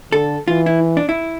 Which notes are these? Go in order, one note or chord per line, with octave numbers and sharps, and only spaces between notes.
D3 A4
E3 F4
E4
D4
E4